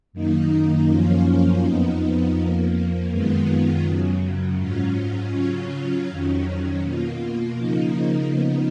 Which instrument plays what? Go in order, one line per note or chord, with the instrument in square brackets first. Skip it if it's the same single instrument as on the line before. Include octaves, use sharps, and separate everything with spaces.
[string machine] F#2 D#3 A#3 D#4
F#2 F3 A#3 C#4 F4
F2 F3 B3 D#4
F2 F3 A#3
F#2 D#3 G#3 B3 F4
F#2 C#3 F#3
G#2 F#3 C#4 F4
C#3 F#3 C#4 F4
F2 D#3 F#3 C#4
B2 A#3 F4
C#3 F3 A#3 D#4
C#3 F3 B3 D#4